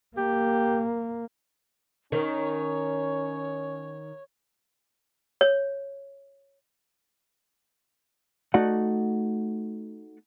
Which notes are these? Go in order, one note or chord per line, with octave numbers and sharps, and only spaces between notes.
A#3 G4
D#3 C#4 C#5
C#5
A3 D#4 F#4 D5 F#5